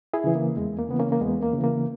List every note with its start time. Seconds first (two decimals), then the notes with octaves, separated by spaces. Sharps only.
0.13 E4 G#4
0.24 C#3 E3
0.35 A#3
0.57 E2 G#3
0.79 A#3
0.88 C#3 E3 B3
0.99 A#3 C#4
1.12 A#3
1.21 E2 G#3 B3
1.43 A#3
1.53 C#3
1.58 E3
1.64 A#3